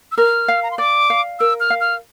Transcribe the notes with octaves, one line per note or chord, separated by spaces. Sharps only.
E6
A#4 F6
F5
A#5
C6
D5 D6
F5
A#4 E6
F6
F5
F6